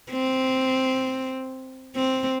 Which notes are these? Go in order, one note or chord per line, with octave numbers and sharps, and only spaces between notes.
C4
C4